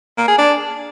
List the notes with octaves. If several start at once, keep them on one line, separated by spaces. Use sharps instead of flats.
A#3
G#4
D4